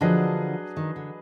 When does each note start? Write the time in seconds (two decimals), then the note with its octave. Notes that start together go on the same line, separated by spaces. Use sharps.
0.01 D3 F3 F#3 D4 G#4 B4 D#5
0.77 D#3
0.96 D3